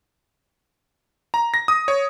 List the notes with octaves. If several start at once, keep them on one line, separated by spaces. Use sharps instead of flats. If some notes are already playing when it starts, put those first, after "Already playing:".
A#5
A#6
D#6
C#5